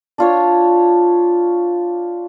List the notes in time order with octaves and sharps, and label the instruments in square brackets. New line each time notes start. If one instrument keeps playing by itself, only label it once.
[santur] D4 F4 C#5